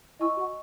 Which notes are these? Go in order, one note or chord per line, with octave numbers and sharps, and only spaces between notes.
E4 D#5 G#5 C#6 E6
F#4